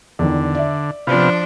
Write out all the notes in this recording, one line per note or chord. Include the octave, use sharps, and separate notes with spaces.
E2 D3 D#3
D5 E5
C3 F3 B3 D4 F4